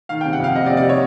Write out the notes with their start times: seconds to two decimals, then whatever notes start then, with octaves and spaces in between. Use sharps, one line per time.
0.09 D#3 F5
0.21 C3 G5
0.33 F#5
0.40 F2 F5
0.55 C3 D#5
0.66 D5
0.70 C3
0.77 D5
0.89 C#5